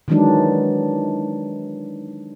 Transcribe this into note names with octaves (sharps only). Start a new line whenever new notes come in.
D#3 E3 F#3 G#3 D4 D#4